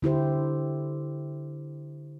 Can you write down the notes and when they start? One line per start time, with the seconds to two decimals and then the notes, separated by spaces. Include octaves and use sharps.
0.02 D3 E4 G4 C5